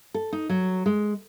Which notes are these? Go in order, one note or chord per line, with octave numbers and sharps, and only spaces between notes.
A4
D#4
F#3
G#3